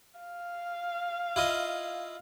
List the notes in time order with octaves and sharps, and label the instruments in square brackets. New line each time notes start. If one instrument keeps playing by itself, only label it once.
[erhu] F5
[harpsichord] E4 F4 D#5